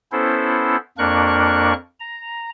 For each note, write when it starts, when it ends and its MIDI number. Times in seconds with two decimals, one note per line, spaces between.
0.12 0.76 59
0.12 0.76 61
0.12 0.76 64
0.12 0.76 69
0.12 0.76 72
0.98 1.73 41
0.98 1.73 58
0.98 1.73 62
0.98 1.73 70
0.98 1.73 85
0.98 1.73 90
2.00 2.50 82